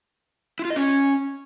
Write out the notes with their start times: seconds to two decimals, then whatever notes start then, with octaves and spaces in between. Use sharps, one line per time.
0.59 E4
0.65 F4
0.70 D#5
0.76 C#4